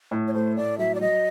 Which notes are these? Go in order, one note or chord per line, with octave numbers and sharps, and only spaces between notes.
A2
C#5
A3 C5
A2 D5
F#3 E5
D5
F#3 D#5